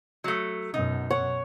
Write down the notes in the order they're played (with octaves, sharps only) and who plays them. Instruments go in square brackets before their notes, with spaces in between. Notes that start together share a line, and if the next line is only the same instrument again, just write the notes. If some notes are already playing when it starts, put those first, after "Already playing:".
[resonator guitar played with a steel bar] F#3 A3
[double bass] F#2 B2 [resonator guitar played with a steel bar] D#4
[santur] C#5 [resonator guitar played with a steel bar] F#5